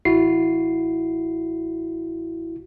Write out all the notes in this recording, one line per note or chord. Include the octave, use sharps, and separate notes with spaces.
A1 E4 F#4 C7